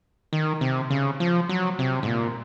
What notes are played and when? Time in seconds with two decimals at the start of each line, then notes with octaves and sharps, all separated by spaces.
0.33 D#3
0.61 C3
0.90 C#3
1.20 F3
1.49 F#3
1.79 C3
2.03 G#2
2.07 A#2